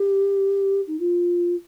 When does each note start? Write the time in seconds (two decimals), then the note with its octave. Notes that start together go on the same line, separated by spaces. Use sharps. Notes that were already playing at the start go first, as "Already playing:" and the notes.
Already playing: G4
0.87 D#4
0.99 F4